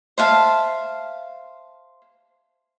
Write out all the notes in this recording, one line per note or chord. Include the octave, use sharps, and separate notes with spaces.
C5 E5 F5 A5